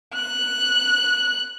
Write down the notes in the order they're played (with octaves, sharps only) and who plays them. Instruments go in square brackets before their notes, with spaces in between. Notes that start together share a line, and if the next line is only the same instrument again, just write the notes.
[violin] F#6